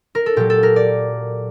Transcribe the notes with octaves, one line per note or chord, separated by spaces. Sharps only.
A#4
A4
A#2 F#3 G4
A4
A#4
D5